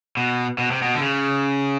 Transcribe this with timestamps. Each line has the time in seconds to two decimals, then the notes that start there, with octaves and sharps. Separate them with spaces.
0.17 B2
0.58 B2
0.71 C3
0.82 B2
0.95 D3
1.01 C#3